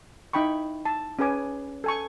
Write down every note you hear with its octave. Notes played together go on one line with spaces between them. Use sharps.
D#4 E4 G5 B5 C#6
A5
C#4 G#4 B4 G#5 D6
A4 G#5 C#6